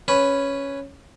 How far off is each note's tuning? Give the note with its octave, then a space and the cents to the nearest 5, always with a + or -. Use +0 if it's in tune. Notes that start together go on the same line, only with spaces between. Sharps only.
C#4 +0 B4 +0